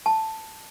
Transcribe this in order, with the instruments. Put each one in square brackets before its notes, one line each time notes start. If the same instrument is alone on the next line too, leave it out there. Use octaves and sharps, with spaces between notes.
[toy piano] A5